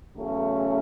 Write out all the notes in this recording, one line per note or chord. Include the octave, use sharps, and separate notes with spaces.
E2 C#3 F#3 A3 C#4